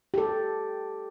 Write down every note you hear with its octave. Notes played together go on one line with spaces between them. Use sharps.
G4 A4